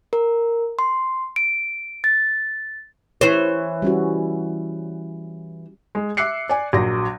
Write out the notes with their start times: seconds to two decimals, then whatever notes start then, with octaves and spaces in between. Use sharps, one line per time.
0.13 A#4
0.79 C6
1.36 D7
2.04 A6
3.21 E3 C5 C#5
3.82 G3 C#4 F#4
5.95 G#3
6.17 E5 D6 E6 F#6 C7 C#7
6.49 D5 G#5
6.73 A#1 F#3 A#6